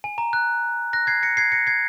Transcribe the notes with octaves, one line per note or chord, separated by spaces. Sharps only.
G#5
A#5
F#6
F#6 A#6
G#6 C7
A#6 C#7
G#6 C7
A#6 C#7
G#6 C7